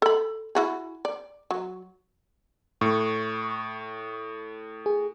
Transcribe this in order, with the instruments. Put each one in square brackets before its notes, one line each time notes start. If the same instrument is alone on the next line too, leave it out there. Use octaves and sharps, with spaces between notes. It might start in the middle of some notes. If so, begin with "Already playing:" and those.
[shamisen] A4 B5
E4 F#4 G#4
D5
F#3
[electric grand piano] A2 [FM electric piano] C#6
[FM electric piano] G#4